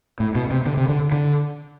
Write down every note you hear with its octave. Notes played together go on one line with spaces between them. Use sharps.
A2
B2
C3
D3
C3
D3
D3